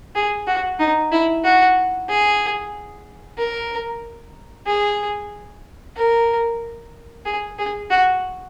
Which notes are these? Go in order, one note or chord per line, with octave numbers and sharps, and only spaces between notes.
G#4
F#4
D#4
E4
F#4
G#4
A#4
G#4
A#4
G#4
G#4
F#4